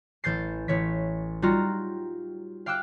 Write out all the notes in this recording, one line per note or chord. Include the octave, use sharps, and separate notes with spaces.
A1 E3 G6 A6 C7
A1 C#5 B6
G3 D#4 F4 F#4 A#5
F5 G5 D6 E6 F#6